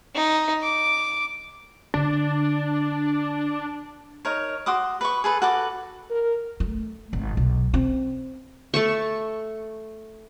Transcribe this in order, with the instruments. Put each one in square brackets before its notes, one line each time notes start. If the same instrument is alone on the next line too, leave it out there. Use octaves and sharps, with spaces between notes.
[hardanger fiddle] D#4
D6
[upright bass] D3 [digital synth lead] D4
[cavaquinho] D#4 A#4 C#5
F#4 C6 D6 D#6
B4 C#6
G#4 A4 B4
F#4 A4 B4 D6
[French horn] A#4
[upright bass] A3
G#1
B1
C4
[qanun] A3 A5 C#6